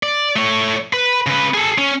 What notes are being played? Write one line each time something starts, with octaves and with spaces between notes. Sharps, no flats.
D5
A3 C#5
B4 B5
C#3 B4
G#4 A4
C#4